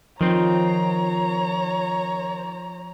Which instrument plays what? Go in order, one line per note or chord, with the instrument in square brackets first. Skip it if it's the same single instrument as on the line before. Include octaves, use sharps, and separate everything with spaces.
[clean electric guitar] D#3 C4 [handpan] F3 [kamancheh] C#5 A#5